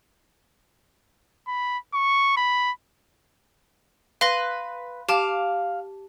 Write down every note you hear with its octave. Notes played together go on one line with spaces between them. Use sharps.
B5
C#6
B5
B4 F5 C6 A#6
G4 F5 A5 D6